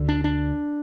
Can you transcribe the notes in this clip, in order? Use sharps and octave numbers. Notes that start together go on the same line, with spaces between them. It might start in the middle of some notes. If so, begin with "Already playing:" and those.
Already playing: D2 D3
D4
D4